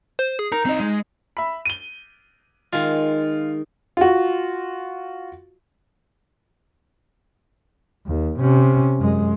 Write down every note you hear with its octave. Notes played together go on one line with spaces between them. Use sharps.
C5
G#4
D#4 A#4
C4 D#5
G#3
E5 B5
D#7 G7
D#3 G#3 F4
F4 F#4
D#2
C3 C#4
F#2 G#3